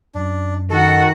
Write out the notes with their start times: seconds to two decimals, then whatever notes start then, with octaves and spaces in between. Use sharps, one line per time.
0.14 F#2 D4
0.70 D#3 F#4 A4 F#5